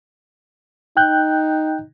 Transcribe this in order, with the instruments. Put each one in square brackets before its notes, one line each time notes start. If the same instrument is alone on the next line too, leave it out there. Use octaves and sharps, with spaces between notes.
[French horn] D#4 [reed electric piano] G5 F#6 G6